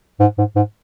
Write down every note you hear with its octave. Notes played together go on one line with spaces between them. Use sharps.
G#2
G#2
G#2